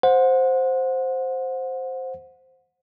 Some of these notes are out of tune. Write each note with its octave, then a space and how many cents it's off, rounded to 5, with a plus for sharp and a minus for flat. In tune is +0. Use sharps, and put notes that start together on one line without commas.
C5 +0 F#5 -25